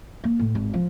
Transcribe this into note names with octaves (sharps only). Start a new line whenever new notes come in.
A#3
A2
G#1
F3